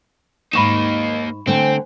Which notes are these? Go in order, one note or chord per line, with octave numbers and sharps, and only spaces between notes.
D#2 G#2 A#3 D#4 B5 C#6 E7
D3 A3 C4 C5 G5 G#5